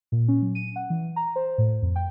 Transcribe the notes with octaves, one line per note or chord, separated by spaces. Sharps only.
A#2
C#4
F#3
D#7
F#5
E3
A#5
C5
A2
F2
G5